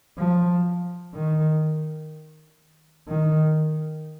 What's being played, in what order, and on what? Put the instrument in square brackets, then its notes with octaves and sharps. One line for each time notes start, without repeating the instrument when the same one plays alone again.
[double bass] F3
D#3
D#3